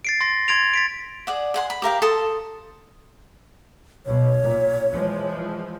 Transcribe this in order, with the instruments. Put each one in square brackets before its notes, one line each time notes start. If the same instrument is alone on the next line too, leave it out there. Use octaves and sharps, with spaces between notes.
[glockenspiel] A6 C7 D7
C6 A6 A#6
C6 G#6 A6 D7 F7
A6 B6 D7
[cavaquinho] G#4 D5 F#5
G#4 F#5 C6
B5
G4 A#4 F5 G5
A4 A5 C6 D#6
[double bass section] B1 B2 [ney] C#5
[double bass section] A#2
E3 F3 G#3